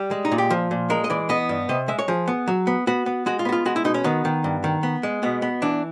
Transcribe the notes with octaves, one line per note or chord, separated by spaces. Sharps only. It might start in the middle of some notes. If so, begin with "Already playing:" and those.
Already playing: G3
G#3
D#4
A#2
G4
F3
A#2
G#3 A#4
D#5
E3 D5
B3 D#5
G2
C3 D#5
G#3 E5
C#5
F3 G#4
B3
F#3
B3
B3 F#4
B3
G#3 F#4
F4
B3 F#4
F4
G#3 F#4
E4
B2 D#4
C#4
D#3 B3
D#3
G2
D#3
B3
G#3
B2 B3
B3
E3 D4